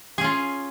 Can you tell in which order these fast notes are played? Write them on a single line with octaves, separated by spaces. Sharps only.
G#4 C#4 F4